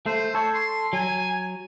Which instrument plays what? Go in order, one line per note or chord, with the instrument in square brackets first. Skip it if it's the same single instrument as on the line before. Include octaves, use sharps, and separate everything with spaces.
[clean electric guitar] A3 [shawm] C5
[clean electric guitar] A4 [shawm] C#5
[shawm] C6
[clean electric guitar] F#3 [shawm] G#5